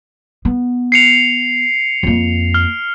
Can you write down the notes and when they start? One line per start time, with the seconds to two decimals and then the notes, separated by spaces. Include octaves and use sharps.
0.45 B3
0.92 C7 C#7 F7
2.03 F2 A#3
2.54 F6